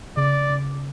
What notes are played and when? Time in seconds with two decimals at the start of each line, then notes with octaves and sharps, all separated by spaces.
0.17 C#3 D5
0.49 C#3